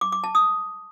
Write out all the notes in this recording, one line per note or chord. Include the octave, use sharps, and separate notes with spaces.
D6
D6
A5
D#6